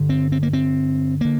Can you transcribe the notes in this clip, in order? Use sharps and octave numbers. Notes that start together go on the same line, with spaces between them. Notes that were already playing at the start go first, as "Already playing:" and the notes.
Already playing: G2 D3
C4
C4
A#3
C4
D3 A#3